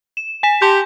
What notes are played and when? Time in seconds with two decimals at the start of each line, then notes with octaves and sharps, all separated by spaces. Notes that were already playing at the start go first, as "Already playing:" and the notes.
0.17 E7
0.43 G#5 B6 E7
0.62 G4 A5 C6 G6